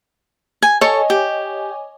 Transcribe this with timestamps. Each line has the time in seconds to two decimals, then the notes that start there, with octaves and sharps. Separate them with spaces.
0.62 G#5
0.81 A4 C#5 D#5 G#5 C#6
1.10 G4